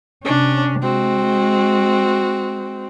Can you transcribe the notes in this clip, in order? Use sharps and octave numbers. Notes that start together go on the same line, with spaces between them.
C3 C#4 D4
G#3 C4 F#4